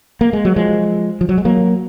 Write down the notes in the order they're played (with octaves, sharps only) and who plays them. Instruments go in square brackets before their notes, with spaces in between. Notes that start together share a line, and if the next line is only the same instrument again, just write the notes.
[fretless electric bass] A#3
G#3
F#3
F3 G#3
F3
F#3
G#3
F#3 A#3